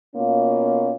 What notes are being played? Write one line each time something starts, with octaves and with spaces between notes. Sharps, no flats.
B2 A#3 C#4 F4